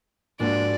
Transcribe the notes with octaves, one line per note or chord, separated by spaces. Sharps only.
G#2 F3 A#3 D4 F#4 D5